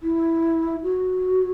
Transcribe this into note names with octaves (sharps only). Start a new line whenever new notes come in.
E4
F#4